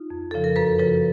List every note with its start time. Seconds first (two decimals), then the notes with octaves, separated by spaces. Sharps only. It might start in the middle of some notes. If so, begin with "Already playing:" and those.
Already playing: D#4 F4
0.10 F2
0.31 C#3 F3 A4
0.44 A#4
0.56 F#2 A4 B4
0.79 C#3 F3 A4 B4